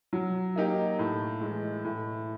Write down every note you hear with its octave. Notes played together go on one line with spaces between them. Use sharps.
F#3
A#3 D#4 G4
A2
E3 G#3
A2